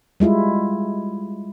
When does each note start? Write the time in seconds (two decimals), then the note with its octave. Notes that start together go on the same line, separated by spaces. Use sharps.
0.20 G3 G#3 E4 F4